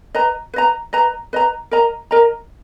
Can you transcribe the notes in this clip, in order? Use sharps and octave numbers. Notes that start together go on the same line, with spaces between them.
B4 D#5 A#5
B4 D#5 A#5
B4 D#5 A#5
B4 D#5 A#5
A#4 D#5 A#5
A#4 D#5 A#5